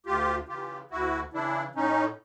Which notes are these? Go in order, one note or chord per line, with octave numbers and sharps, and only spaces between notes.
D2 F4 G4
C#3 E3 F4 G4
D2 E4 F#4
C#3 E3 D4 E4
A2 C#4 D#4